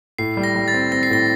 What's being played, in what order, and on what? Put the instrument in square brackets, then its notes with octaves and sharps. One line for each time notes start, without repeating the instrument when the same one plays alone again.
[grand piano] A2 [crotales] C7
[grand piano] G3
[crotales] A#6
[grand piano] G3
[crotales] A6
[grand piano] C4
[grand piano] C4 [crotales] A#6
[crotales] C7
[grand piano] A2 [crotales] A#6